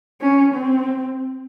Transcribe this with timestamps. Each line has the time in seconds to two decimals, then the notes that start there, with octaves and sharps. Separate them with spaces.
0.22 C#4
0.55 C4